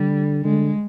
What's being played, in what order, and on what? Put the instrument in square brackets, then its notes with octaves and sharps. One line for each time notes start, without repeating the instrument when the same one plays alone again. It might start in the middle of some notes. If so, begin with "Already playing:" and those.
Already playing: [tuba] D3 [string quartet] G3
[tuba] D3 [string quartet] G#3